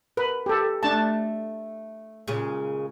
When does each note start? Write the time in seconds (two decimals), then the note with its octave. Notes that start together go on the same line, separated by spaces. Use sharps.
0.17 A#4 B4
0.46 G4 A4
0.83 A3 D4 A5
2.28 A#2 C#3 G#3